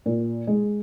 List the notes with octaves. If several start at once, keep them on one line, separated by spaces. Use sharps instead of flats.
A#2
G#3